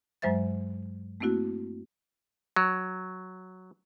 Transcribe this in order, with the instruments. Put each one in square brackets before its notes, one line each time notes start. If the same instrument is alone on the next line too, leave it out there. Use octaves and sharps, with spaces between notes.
[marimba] G2 F#3 G#3 C5 E5 A6
A3 A#3 C4 E4 F#4
[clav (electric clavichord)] F#3